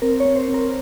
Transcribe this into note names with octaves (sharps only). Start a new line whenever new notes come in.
C4 A#4
C#5
C4
C5
C4
A#4